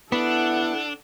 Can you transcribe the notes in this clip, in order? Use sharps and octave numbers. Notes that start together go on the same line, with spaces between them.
B3 D4 E4 A4 F#5